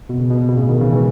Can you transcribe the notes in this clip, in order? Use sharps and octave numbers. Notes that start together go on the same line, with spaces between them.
B2
C#3
B2
B2
A2 C#3
B2 D#3
C#3 E3
E3 G#3